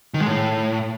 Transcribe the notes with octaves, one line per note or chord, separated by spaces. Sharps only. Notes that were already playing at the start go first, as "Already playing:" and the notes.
D#3
G#3
A2